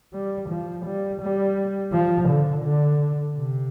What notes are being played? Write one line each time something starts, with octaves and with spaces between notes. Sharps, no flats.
G3
F3
G3
G3
F3
D3
D3
C3